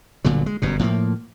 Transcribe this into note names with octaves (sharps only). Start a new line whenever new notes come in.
G1 A#2 D3 F#3
G#3
G1 F#2 B2
A2 F3 G3 A#3